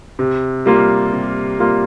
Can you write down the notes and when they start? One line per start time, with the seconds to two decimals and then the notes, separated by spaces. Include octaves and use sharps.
0.19 C3
0.66 G3 A#3 F4
1.13 C3
1.59 G3 A#3 F4